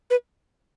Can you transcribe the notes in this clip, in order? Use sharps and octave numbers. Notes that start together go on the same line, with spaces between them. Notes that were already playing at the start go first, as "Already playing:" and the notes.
B4